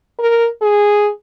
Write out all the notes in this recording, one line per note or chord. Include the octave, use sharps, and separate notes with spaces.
A#4
G#4